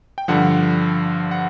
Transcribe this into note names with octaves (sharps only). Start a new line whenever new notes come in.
G5
G2 D3 F3 F#5
F#5